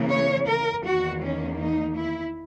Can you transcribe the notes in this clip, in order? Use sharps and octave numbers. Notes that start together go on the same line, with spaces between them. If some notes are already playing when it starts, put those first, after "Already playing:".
Already playing: C#3 E3 A#3
C#5
A#4
E2 D#3 A#3 F#4
C#4
D#4
E4